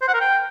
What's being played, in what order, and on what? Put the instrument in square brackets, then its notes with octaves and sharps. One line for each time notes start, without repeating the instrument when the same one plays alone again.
[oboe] C5
F#5
A#4
G5